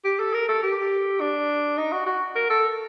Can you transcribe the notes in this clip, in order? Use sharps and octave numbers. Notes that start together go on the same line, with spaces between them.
G4
A4
A#4
A4
G4
D4
D#4
F#4
F#4
A#4
A4